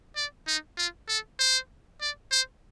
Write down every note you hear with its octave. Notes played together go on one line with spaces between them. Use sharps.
D5
D#4
F4
A4
C5
D5
C5